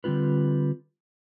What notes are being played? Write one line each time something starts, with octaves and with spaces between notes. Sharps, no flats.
D3 G3 C4 F4 B4